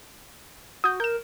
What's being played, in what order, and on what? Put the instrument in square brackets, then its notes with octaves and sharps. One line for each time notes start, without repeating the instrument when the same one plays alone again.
[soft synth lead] F#4 [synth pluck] D#6 G6
[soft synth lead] A#4 [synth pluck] G6 E7